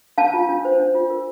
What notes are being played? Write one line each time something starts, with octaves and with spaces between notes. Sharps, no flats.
D4 F5 A5
F4
D4
C5
D4
F4
A#4